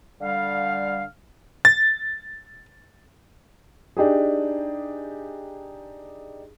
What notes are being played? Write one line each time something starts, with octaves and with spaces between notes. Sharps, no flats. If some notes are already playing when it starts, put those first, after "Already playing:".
D3 G3 F5
A6
D4 D#4 G4 G#4